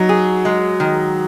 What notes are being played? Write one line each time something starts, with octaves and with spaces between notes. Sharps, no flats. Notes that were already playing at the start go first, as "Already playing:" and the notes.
Already playing: F#3 D#4
G#4
G#3
D#3